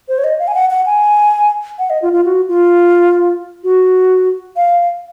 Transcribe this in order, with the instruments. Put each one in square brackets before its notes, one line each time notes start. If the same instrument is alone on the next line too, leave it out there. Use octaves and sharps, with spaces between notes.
[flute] C5
C#5
D#5
F5
G#5
F#5
F#5
G#5
F#5
D#5
F4
F4
F#4
F4
F#4
F5